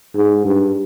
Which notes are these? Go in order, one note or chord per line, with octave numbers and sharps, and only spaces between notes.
G#2
G2